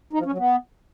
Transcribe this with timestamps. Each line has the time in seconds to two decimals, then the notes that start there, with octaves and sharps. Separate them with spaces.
0.13 D#4
0.19 F3
0.26 C#4
0.32 F#3
0.38 B3